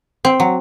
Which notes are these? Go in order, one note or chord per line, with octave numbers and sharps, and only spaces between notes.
C4
F#3